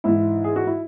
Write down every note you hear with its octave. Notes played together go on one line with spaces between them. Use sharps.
G#2 E3 E4
G#4
F#4
E4